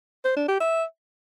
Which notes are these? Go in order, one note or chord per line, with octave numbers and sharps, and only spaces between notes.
C5
D4
G4
E5